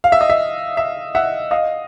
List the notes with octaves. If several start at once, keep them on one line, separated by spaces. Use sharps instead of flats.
F5
E5
D#5
E5
E5
E5 F#5
D#5 F5